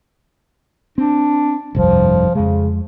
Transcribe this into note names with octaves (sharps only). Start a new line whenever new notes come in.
C4 D4
F1 C2 G2 F3
F2 C#3 G#3